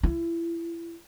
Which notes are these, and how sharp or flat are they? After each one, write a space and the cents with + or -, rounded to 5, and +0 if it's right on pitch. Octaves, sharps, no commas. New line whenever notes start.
E4 +30